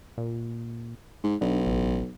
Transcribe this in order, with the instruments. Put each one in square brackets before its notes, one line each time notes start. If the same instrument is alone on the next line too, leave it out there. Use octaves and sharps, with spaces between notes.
[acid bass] A#2
[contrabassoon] G#2
[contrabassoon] B1 [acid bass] D4
[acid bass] A1